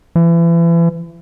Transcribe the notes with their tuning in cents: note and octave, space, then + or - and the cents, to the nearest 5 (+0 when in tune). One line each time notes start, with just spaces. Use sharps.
E3 +35